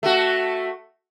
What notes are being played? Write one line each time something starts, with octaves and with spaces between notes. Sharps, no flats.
A3 F#4